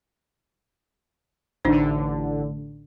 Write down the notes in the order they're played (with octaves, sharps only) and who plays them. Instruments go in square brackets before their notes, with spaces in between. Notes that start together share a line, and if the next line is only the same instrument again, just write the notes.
[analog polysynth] A1 D3 [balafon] D4 D#4 C5